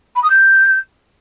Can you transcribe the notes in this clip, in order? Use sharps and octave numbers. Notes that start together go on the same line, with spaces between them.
B5
D#6
G6